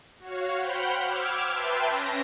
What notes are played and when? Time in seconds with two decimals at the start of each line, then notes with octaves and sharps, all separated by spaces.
0.19 F#4 C#5 F5
0.56 C5 F#5 G5 B5 F6 G6
1.02 D6 E6 F6 G#6
1.51 B4 E5 G5 A5 C6
1.87 C#4 A#6